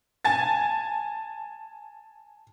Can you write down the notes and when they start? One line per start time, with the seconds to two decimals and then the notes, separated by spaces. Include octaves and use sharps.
0.25 G#5 A5 A6